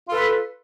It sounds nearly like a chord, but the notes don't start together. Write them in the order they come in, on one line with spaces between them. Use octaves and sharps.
F4 A4 B4